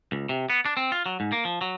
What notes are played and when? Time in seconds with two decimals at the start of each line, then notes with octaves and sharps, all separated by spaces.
0.12 C#2
0.29 C3
0.50 B3
0.65 D4
0.77 C4
0.92 F4
1.06 F#3
1.20 G#2
1.32 A#3
1.45 F3
1.61 F#3